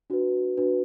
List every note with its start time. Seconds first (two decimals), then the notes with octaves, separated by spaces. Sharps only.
0.10 D4 F#4 B4
0.58 D4 F#4 B4